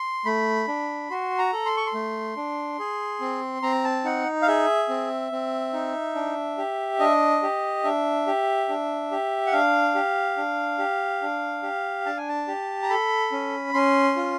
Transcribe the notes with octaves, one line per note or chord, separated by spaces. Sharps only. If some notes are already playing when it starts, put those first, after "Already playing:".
Already playing: C6
A3 B5
D4
F#4 C6
A#5
A4
C6
C#6
C6
A3
D4
G#4
C4
C4 A#5
A5
D#4 F#5
F5
G#4 E5
C4
C4
D#4
D4
G4
D4 D#5
G4
D4 E5
G4
D4
G4
F#5
D4 F5
G4
D4
G4
D4
G4
D4 A5
G#5
A5
G4
A#5
A4 B5
C#4
C#4 C6
F4